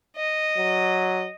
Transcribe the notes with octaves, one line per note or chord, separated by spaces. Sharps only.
D#5
F#3